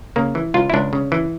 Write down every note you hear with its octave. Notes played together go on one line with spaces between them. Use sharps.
C#3 A#3
E3
C#2 F4
E4
C#2 D4
C#3
E3